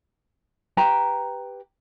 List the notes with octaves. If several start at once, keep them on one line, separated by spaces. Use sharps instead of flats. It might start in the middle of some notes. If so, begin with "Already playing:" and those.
G4 B4 G5 A#5